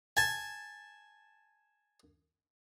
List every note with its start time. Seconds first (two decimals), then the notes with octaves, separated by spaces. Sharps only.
0.17 G#5 A5